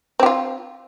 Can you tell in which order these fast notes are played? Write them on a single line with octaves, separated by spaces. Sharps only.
C4 G4 F4